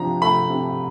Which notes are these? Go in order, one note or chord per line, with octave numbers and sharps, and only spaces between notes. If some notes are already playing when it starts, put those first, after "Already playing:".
Already playing: C3 F3 D4 A#5
A3 B5
C3